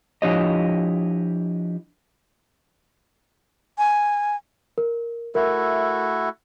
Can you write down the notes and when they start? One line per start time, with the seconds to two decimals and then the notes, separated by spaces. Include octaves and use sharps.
0.22 F3 D4 E4 G4 C#5 D#5
3.78 G#5
4.78 A#4
5.35 A3 E4 F#4 A#4